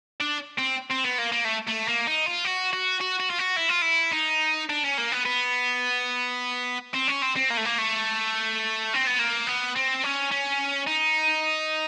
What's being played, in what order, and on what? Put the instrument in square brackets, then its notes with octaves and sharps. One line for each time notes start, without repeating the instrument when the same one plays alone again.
[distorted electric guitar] D4
C4
C4
B3
A#3
A#3
A3
A3
A#3
D#4
F4
F#4
F#4
F#4
F#4
F4
F#4
E4
F4
E4
D#4
D4
C#4
A#3
B3
B3
C4
C#4
C4
C4
A#3
A3
A#3
A3
C4
B3
A#3
B3
C4
C#4
C#4
D#4